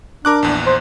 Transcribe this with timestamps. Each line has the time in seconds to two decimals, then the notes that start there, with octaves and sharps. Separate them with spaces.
0.25 D4 A#4 D6 F#6
0.43 A#1 E2
0.67 C5